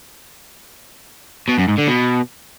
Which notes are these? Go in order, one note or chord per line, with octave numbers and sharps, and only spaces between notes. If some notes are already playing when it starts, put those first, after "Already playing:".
B2
F#2
G#2
D3
B2